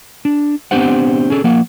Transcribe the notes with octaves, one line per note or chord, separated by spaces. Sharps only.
D4
B3 C4 D4 G4 C5 F#5
C#4 G#4 A4
F3 A#3 F#5